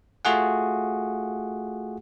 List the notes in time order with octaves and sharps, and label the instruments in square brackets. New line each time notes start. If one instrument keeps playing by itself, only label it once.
[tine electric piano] A3 F4 F#4 G#4 F#5